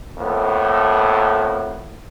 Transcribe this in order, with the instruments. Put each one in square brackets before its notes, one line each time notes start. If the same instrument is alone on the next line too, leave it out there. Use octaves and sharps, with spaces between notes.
[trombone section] F2 A2 A#3 B3